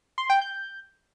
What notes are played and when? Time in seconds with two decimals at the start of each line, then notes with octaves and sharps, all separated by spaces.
0.18 C6
0.30 G5
0.41 G6